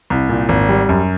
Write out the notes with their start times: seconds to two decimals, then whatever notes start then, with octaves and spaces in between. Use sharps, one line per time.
0.10 C2
0.29 A#2
0.49 G#1
0.69 G3
0.89 F#2